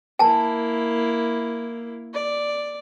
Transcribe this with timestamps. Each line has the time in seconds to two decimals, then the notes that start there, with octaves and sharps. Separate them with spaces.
0.19 A#3 E4 G#5 A5
2.13 D5